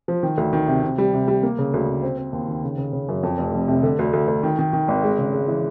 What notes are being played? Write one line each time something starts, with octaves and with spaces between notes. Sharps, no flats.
F3
D#3
D2
D#3
C3
C3
G3
C3
G3
A#3
C#3
D2
C#3
C4
C4
D#2
D#3
C#3
C#3
C#3
F#2
F2
F1
F1
C3
D3
D2
D2
D2
D#3
D#3
D#3
G#1
G#3
C#3
G#3
E3